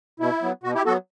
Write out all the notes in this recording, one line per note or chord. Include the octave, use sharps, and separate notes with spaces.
B2 E4
F#3 B3
B2 F#4
E4 G4
F#3 B3 F#4 A4